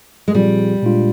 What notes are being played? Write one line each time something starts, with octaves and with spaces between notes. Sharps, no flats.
G#3
A#2 F3 G3 C4 F4 G#4
A#2 G#3 D4 F4